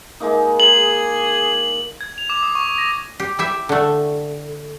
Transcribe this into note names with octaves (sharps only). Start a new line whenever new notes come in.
G#3 A#3 D#4
G#4 F#7
G#6
F7
D6
D#6
C#6
A#6
G4
E4 G4 E5
D3 A3